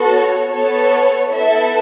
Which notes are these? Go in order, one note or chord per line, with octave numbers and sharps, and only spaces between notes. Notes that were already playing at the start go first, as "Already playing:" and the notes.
Already playing: B3 F#4 A4
C#5
B3 A4 C#5
B3 E4 A4 E5